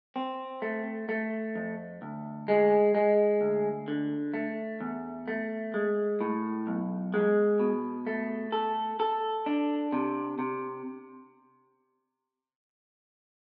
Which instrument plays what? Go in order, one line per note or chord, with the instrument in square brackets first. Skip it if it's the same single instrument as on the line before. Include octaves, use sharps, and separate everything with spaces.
[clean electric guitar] C4
A3
A3
F2
D2
G#3
G#3
D2
D3
A3
E2
A3
G#3
A2
B1
G#3
B2
A3
A4
A4
D4
C3
C3